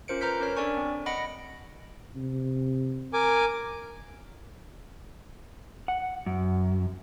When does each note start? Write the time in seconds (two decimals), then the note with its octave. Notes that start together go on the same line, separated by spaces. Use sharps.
0.08 C#4 F4 A#4 C5 C#7 D7
0.21 B4 A#5 F6 G6 B6
0.40 C#4 A#4 C#5 F6
0.57 D4 A4 D5 G#5 C#6
0.77 C4
1.06 D#5 F#5 B5 A#6 C#7 D7
2.16 C3
3.13 A#4 G#5 D6
5.88 F#5
6.26 F#2